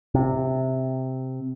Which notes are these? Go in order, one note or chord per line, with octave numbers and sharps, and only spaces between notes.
C3